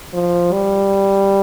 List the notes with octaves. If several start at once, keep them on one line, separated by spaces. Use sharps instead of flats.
F3
G3